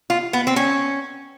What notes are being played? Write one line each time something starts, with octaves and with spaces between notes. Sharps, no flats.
F4
B3
C4
C#4